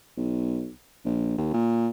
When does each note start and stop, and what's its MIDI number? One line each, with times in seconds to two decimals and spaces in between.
0.17 0.70 35
1.05 1.33 34
1.38 1.50 39
1.53 1.89 46